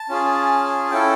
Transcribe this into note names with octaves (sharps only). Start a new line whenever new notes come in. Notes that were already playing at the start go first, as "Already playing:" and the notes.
Already playing: A5
C#4 F4 G#4
C#4 E4 A4 G5